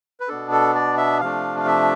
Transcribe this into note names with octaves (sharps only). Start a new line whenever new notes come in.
B4
B2 B3 D4 A4
A4
D5
E5
C3 F3 A3 D4 F5
F5
E5